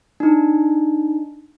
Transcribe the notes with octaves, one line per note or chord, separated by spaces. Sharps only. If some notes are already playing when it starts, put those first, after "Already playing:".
D4 D#4